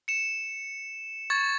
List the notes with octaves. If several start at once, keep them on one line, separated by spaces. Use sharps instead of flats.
C#7 E7
C#6 G#6 A6